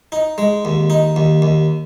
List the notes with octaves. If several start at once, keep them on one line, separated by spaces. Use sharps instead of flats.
D#4
G#3
D#2
D#4
D#2
D#2